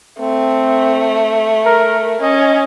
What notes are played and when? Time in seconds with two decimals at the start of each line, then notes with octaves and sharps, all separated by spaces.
0.19 A3 C4
1.65 A#4
2.22 C#4 D#5